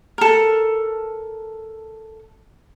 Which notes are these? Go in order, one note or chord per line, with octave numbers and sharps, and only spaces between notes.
A4 A#4